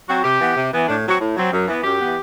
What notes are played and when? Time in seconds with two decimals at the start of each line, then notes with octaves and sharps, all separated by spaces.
0.08 F#3 C4 F#4
0.24 C3 G4
0.40 E3 B3
0.56 C3
0.73 E3 B3
0.88 A2 D4
1.05 F#3 C4 F#4
1.20 A2
1.37 F#3 C4
1.53 F#2
1.68 E3 B3
1.84 F#2 G4
1.99 B3
2.04 E3